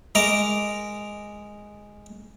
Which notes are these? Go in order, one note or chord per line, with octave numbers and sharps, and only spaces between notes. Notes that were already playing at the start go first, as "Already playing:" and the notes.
G#3 A#4 A#5 D6 D#6